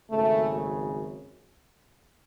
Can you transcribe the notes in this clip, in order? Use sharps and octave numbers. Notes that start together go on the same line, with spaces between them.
G#1 F#2 C#3 A3